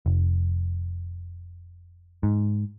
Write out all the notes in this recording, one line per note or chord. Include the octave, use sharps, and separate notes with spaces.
F1
G#2